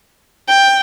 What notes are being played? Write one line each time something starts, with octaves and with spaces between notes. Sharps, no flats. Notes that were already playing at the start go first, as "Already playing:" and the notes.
G5